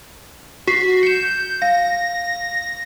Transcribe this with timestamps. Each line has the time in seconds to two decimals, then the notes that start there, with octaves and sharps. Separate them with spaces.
0.67 F#4 B6 C7
1.03 G6 C#7 E7
1.62 F5 A#6